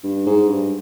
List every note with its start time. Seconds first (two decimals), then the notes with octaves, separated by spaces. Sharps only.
0.04 G2
0.26 G#2
0.49 G2